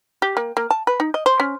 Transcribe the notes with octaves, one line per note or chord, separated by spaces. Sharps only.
G4
A#3
A#3
A5
B4
D#4
D#5
C5
C#4